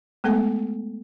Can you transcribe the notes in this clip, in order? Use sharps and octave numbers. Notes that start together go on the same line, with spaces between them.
G#3 A3 B3 A4 F#5 G#5